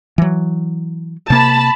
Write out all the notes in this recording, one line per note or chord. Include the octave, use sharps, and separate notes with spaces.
E3 F#3
C3 A#3 A5 B5